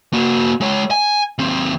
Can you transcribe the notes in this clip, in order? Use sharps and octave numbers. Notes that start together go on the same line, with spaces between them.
A#3 F#4
G#3 C#5
G#5
D#2 C4